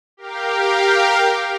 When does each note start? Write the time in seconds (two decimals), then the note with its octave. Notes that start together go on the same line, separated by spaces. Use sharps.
0.17 G4 A#4 F5 G5